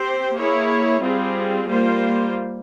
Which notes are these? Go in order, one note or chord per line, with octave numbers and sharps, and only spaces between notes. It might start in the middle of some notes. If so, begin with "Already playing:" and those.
Already playing: C4 G4 C5
A#3 E4 G#4 C#5
G3 C4 F4 G#4
G3 A#3 F4 C5